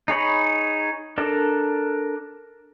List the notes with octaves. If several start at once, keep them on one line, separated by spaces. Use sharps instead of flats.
D#4 G#4 C#5 B5
D4 A4 A#4 D5